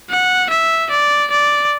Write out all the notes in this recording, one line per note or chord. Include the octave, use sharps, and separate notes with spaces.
F#5
E5
D5
D5